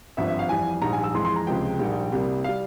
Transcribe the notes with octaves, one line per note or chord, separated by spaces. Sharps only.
G#1 G2 F3 E5
E5
F5
F2 E3 G3 G#5
A#1 G#2 G3 A#5
G#5
E6
F2 E3 G#3 C6
C6
A#5
C#2 C3 F3 G#3 G5
A#1 G#2 G3 A#3
C2 C3 G3 A#3
G3 F5